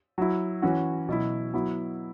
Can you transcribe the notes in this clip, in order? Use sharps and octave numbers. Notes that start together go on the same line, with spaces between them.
F#3 E4
E3 C#4 F#4
B2 F#3 E4
F#3 B3 E4